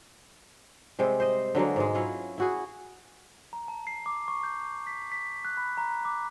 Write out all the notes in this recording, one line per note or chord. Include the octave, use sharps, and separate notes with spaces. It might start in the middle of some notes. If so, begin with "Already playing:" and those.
C3 G3 G#3 C4
C5 D#5
D3 F#3 G#3 A#3
G#2 B2 G#3
F#3 C#4 E4 F4
E4 F#4 G#4
A#5
A5
C7
D6
C#6
G6
B6
B6
F#6
B5
A#5
D6